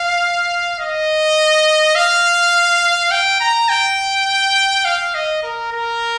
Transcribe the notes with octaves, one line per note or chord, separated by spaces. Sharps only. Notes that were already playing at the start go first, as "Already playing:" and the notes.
Already playing: F5
D#5
F5
G5
A#5
G5
F5
D#5
A#4
A#4